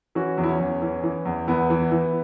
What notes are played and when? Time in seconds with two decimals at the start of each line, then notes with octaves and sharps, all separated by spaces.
0.15 E3 C#4 F#4
0.38 E2
0.43 E4
0.49 C#4
0.60 E2
0.82 E3 C#4
1.03 E3
1.25 E2
1.48 E2 B3 E4
1.70 E3
1.92 E3